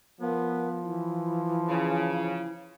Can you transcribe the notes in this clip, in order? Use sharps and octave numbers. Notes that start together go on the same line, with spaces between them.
F3 B3 A#4
E3 E4
C#3